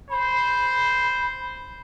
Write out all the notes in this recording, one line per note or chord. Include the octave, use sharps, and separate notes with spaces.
C5 B5